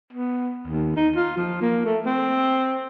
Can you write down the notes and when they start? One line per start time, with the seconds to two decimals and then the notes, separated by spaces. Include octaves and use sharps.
0.13 B3
0.68 D#2
0.96 D#4
1.15 F4
1.37 F3
1.61 A#3
1.85 A3
2.06 C4